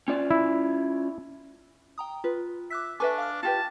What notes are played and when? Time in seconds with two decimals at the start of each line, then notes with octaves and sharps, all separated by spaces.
0.08 C#4 F4 D5
0.31 E4
1.98 G5 A#5 D#6
2.24 F4 B4
2.71 E5 D6 F#6 B6
3.00 D4 A4 B4 E5 G#5 C#6 D6
3.18 F5 D6 F6
3.43 F4 G4 B4 A5